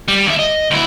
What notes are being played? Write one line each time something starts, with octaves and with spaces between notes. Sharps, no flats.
G3
D#2 E5
D#5
D2 E4